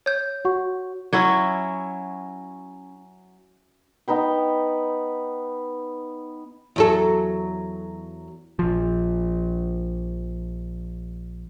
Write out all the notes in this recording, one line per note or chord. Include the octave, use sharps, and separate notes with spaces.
C#5 G6
F#4 F#5 C#6
F#3 C#4 E4 E5
B3 D#4 B4 G5
E2 F#3 A4
A#1 F3